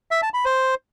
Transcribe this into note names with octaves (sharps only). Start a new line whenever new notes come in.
E5
A5
B5
C5